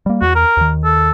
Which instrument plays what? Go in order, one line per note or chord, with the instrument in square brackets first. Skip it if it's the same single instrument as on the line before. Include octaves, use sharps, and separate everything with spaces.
[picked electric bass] G3 A#3
[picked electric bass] E2 [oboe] F#4
[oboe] A#4
[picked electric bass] D#2 D#3
[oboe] A4